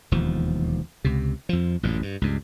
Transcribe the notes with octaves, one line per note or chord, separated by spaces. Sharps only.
E1 D#2 F3
C#2 C3
F2 F3
A1 F#2 A#2
G2
C#2 G2